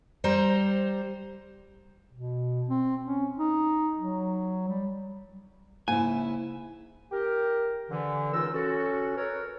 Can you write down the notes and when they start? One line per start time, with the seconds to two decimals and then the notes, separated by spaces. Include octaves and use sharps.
0.24 G3 C5 A#5
2.12 B2
2.70 C4
3.04 C#4
3.38 D#4
3.99 F#3
4.68 G3
5.88 G#2 C#3 A#3 E4 G#5
7.12 G4 A#4
7.91 D3 E3
8.34 C#2 D#4 F4 A#4 E6
8.54 C#4 F#4 A4
9.17 A#4 B4 C#5